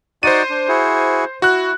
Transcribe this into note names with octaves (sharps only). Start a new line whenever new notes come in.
D#4 F#4 C5 D5 D#7
D4
E4 F#4 G#4
E4 F#4 F#6